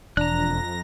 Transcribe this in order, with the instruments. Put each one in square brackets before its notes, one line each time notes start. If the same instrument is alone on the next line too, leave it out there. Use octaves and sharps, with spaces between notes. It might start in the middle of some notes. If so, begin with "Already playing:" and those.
[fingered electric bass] E1 [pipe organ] F2 A#6 [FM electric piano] D4 [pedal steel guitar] A#5 F#6